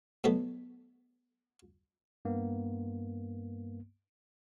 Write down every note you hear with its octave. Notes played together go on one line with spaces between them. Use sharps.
B2 F#3 A3 B3
G2 A#3 B3